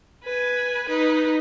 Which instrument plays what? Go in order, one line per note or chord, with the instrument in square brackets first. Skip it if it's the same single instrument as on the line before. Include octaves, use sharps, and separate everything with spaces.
[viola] B4 G#5
D#4 B4